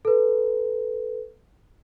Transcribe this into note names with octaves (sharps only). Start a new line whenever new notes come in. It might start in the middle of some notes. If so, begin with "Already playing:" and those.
A4 B4